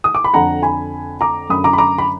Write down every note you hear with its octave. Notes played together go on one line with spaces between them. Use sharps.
D#6
D6
B5
F2 D3 F#5 A#5
G#5 B5
A#5 D6
F#2 D3 B5 D#6
A#5 D6
B5
A#5 D6
B5